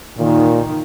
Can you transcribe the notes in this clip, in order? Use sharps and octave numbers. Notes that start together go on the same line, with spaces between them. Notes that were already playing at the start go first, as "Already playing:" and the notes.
A#2 D#3